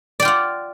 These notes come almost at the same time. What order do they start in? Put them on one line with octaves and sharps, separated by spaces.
D5 G5 F4 F#5